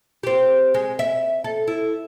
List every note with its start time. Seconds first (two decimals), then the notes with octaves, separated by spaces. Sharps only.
0.23 C4 G4
0.74 G#3
0.99 E5
1.44 A4
1.68 E4